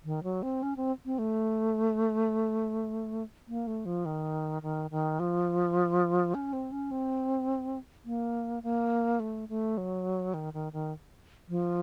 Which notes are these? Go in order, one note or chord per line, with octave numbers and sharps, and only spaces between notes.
D#3
F#3
C4
C#4
C4
C4
A3
A#3
A3
F3
D#3
D#3
D#3
F3
C#4
C4
C#4
C4
A#3
A#3
A3
A3
F#3
D#3
D#3
D#3
F3